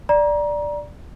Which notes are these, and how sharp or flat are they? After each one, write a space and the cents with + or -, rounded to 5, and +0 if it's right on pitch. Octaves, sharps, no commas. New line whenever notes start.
D5 +0 A#5 +25